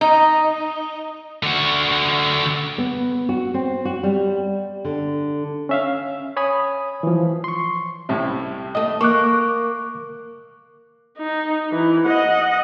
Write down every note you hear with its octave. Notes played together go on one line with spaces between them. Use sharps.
D#4
D3 F#4
B3
F#4
C4
F#4
G3
D3
C#4 E5 F5
C#5 G#5 B5 D#6
E3 F3
C6 C#6
C2 A2 C3
D#2 A3 D#5
A#3 C#6 D6 F#6
D#4
E3
D#5 F#5